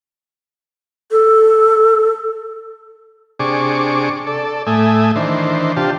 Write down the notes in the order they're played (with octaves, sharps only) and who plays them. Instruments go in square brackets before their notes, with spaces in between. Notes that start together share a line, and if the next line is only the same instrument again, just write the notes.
[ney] A4
[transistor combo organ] C3 D4 G#4 C#6 D6
A4 D5
A2 A3 E5 G#5 D#6
D#3 E3 D4 C5
C3 D4 F4 G4 A5